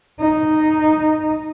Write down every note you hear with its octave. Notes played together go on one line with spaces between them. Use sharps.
D#4